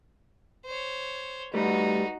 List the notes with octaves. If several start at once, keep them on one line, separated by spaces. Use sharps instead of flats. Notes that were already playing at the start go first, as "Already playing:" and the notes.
C5 C#5
G3 A3 D#4 F#4 B4